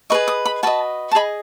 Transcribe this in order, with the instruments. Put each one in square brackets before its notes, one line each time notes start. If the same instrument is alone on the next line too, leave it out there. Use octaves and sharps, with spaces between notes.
[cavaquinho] G#4 B4 D#5 C#6
D#6
B5
F#4 B4 D#5 A5
A5
G#4 D#5 B5